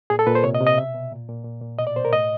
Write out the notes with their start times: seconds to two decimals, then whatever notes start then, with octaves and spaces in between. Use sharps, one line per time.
0.10 A#2 G#4
0.19 A4
0.27 A#2 B4
0.35 C5
0.44 C3 C#5
0.55 D#5
0.61 C3
0.67 D#5
0.77 B2 E5
0.94 B2
1.12 A#2
1.28 A#2
1.45 A#2
1.62 A#2
1.79 B2 D#5
1.87 D5
1.96 B2 C5
2.05 A#4
2.13 A2 D#5